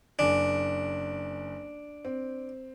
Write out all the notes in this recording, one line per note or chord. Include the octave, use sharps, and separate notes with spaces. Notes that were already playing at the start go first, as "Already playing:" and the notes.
F#1 D4 G#5
C4